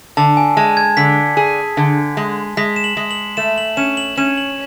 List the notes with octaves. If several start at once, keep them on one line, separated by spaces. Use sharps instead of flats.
D3 A5
G#5
G#3 A5
G#6
D3 B6
G#4
D3
G#3
G#3 B6
E7
F#7
G#3
F#7
A3 E7
F#7
C#4 E7
F#7
C#4 E7
F#7